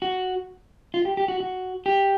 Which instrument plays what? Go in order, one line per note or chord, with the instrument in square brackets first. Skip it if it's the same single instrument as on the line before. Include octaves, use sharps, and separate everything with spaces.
[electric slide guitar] F#4
F4
G4
G4
F#4
F#4
G4